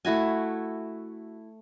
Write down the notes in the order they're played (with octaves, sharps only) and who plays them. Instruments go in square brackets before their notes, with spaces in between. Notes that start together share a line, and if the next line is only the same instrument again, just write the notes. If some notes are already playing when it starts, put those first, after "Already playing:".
[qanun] A3 E4 F#4 G#5